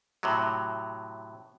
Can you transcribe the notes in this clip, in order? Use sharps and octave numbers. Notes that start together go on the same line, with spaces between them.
A2 C3 F#3